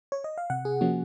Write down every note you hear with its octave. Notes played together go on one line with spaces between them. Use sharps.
C#5
D#5
F5
C3 F#5
G#4
F3 A#3 C#4 F#4